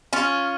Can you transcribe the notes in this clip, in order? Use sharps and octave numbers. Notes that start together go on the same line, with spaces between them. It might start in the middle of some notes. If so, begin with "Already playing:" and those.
C#4 F4